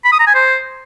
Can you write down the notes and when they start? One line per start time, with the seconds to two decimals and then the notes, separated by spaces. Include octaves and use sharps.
0.05 B5
0.12 D#6
0.20 A#5
0.27 G#5
0.34 C5